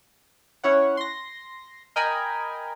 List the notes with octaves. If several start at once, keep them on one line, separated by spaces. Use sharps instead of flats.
C#4 E4 C#5 F#5
C6 A#6
A#4 D#5 G5 G#5 A#5 B5